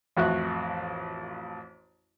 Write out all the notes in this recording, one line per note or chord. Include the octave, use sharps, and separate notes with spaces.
A1 F2 F#4 E5 F#6